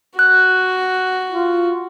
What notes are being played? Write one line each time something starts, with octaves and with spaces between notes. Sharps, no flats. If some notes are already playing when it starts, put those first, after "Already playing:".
F#4 F#6
F4